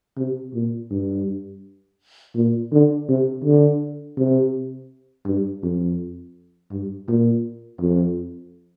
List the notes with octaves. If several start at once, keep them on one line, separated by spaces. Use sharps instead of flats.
C3
A#2
G2
A#2
D3
C3
D3
C3
G2
F2
G2
A#2
F2